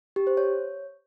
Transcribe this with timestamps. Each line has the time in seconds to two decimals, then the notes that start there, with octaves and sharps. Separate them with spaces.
0.16 G4
0.27 C5
0.37 C#5